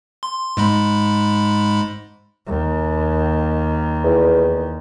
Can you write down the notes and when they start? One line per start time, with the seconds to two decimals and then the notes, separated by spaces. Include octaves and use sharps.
0.23 C6
0.57 G#2 G#3 B5
2.47 D#2
4.04 E2